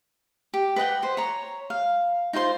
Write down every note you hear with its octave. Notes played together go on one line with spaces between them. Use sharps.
G4
B4 D#5 F#5 G5
B4 C5
C#5 A#5
F5
D#4 F4 C5 C6